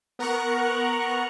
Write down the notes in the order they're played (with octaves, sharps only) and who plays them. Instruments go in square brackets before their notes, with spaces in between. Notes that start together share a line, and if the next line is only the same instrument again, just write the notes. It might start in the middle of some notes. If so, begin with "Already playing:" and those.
[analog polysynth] B3 A#4 F#5 A#5 C#6 F#6